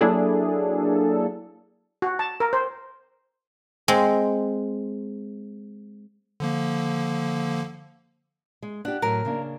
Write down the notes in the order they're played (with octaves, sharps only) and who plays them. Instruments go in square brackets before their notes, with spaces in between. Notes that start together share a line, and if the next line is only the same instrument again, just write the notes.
[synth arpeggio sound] F#3 A#3 D4 E4 G#4 A4
[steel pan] F#4
A5
A#4
C5
[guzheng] G#3 C4
[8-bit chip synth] D3 F3 A#3
[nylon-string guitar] G#3
[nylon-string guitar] D4 G4 [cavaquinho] F#5
[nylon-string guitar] A2 F#3 [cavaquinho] A#4
[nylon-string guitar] C#3 A#3 D4